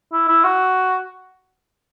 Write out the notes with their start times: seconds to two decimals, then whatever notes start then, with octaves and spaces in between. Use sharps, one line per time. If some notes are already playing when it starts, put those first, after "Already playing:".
0.12 E4
0.28 E4
0.44 F#4